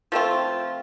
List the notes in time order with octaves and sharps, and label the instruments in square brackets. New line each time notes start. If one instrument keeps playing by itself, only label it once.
[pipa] F3 A3 C4 F4